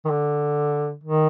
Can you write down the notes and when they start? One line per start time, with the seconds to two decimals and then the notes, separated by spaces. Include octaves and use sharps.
0.05 D#3
0.10 D3
1.03 D#3